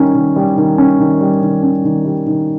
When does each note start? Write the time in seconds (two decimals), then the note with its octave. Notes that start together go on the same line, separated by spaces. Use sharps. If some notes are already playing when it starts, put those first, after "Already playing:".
Already playing: D#3 G3 C#4
0.15 D#3
0.36 G3
0.58 D#3
0.78 C#4
1.00 D#3
1.21 G3
1.42 D#3
1.63 C#4
1.85 D#3
2.06 G3
2.27 D#3